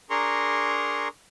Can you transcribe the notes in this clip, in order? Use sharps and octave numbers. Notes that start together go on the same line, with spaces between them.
D4 G#4 A#4 A#5 C6 C#6